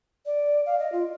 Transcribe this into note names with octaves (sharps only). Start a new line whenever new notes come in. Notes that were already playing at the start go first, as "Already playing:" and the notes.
D5
F5
D#5
F4